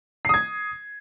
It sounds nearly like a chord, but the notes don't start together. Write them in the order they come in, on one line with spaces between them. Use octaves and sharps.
C7 D#6 G#6